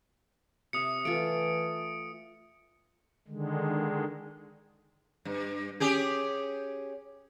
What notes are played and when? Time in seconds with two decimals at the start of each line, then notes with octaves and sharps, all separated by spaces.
0.73 C3 E5 D#6 C#7
1.05 E3 A3 F4 C#6 D7
3.28 D3 D#3 G#3
5.25 G2
5.80 C#4 G4 G#4